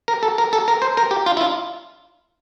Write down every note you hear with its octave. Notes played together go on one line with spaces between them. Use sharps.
A#4
A4
A#4
A4
A#4
C5
A#4
G4
F4
E4
F4